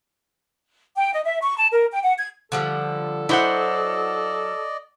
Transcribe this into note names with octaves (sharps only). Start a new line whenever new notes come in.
G5
D#5
E5
C#6
A5
A#4
G5
F#5
G#6
D3 F3 G3 A4
F#3 E4 C5 D5 D#5 F#5